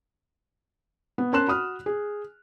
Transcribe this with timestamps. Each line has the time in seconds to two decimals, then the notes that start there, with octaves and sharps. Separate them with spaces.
1.18 B3
1.33 C#4 A#4 A5 C6 F#6 E7
1.47 F#4 B5 D#6 F6
1.86 G#4